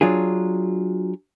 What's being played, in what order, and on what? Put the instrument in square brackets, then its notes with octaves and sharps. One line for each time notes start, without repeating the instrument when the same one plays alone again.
[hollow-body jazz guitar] F#3 D4 F4 G#4